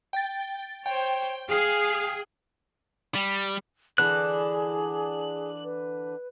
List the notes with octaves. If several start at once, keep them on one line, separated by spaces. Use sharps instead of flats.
G5 A6
C5 C#5 G5
G#4 F5
G3
D3 E3 D4 G#4 F#6
B4